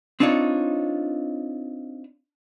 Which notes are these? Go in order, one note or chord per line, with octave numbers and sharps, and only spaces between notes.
C4 D4 D#4 F4 C#5